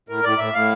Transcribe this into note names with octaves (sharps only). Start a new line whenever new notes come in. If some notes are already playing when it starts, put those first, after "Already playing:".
A2 A#4
A2 D5
A2 E5
A2 F5